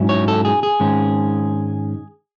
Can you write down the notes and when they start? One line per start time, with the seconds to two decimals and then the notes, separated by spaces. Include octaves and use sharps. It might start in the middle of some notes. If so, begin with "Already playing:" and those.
Already playing: G#2 F#3 C#4 E4
0.09 C#5
0.28 A4
0.45 G#4
0.63 G#4
0.80 G#2 D#3 G#3 C#4